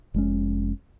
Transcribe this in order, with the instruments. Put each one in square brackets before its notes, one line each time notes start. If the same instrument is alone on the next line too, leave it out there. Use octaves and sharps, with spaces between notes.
[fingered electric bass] F1 G#3 C#4